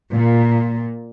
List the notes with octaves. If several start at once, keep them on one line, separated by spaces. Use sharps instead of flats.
A#2